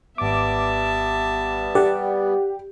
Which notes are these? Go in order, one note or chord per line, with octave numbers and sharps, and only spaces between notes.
G#1 G3 B3 E5 A5 D6
G4 D5 F#5